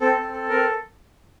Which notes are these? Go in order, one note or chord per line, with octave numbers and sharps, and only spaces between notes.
C4 A4
C4
A4
C4 A#4